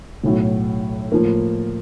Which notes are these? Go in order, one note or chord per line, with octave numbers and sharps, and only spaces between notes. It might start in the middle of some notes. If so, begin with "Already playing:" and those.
B1 A2 F#3
A2 F3 A#3